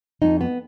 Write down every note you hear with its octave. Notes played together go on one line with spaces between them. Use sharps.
F2 D#4
B3